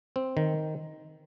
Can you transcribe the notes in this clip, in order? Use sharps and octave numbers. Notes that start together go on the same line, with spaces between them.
C4
D#3